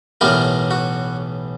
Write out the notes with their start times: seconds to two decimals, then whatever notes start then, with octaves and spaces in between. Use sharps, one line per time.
0.21 B1 A2 E3 G3 B3 A#4
0.71 F#4